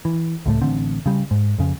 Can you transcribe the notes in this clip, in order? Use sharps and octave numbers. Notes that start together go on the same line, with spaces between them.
E3
C#2 A2 A3
A1 D3 C4
C#3 G3
G#2
F2 C#3